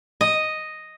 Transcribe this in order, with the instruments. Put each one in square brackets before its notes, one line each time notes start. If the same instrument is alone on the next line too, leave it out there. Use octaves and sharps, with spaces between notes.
[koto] D#5